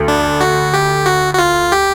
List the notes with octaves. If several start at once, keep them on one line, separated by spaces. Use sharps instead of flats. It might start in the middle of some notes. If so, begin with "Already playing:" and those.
Already playing: D2
D4
F#4
G4
F#4
F#4
F4
G4